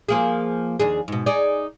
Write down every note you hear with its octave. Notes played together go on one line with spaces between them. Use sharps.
F3 A#3 G#4
D#2 D4 G#4
G#2 B2
D#4 G#4 D5